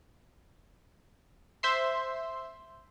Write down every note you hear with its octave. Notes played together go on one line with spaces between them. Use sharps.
C5 E5 C6